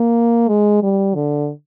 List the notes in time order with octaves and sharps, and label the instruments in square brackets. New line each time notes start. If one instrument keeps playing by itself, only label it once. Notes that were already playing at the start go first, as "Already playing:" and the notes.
Already playing: [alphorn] A#3
G#3
G3
D3